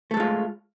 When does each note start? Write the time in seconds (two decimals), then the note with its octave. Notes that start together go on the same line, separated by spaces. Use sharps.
0.11 A3
0.14 A4
0.17 G#3
0.20 F4